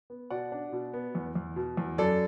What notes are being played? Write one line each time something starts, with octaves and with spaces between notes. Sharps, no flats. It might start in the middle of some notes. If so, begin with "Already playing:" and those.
B3
B2 D5 F#5
D4
B2
B3
E2
E2
B2
E2
F#2 A4 D5